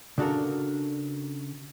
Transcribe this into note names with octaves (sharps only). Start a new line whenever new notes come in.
C#3 D4 F#4 A4 A#4